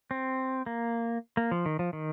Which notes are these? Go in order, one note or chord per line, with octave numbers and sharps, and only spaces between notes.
C4
A#3
A#3
F3
D#3
F3
D#3